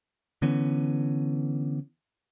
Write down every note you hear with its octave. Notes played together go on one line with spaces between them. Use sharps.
D3 E3 B3 C#4